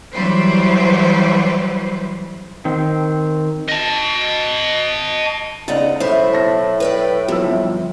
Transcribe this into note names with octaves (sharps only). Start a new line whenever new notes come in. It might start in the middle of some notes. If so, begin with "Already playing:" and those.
E3 F#3 G3 B4 C5
D#3 C4
D#5 A5
D2 C#3 D#4 D5 D#5 F#5 A#5
B1 A2 E4 C5 E5
A5 A#6
B4 D5 G5
F3 F#3 E4 E6
G1 F2 E5 G5